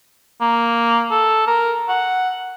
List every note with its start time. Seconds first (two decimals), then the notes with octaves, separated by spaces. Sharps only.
0.41 A#3
1.11 A4
1.47 A#4
1.89 F#5